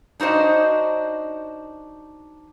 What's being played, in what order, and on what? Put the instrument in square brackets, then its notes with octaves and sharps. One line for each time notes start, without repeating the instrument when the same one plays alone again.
[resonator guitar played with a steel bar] D4 D#4 F#4 C5 D#5